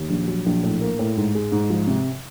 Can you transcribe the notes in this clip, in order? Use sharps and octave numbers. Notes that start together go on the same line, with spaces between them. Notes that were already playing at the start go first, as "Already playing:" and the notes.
Already playing: D#2
A#1
F#3
A#1
A2
A#3
A2
G#2
G#3
G#2
F3
C3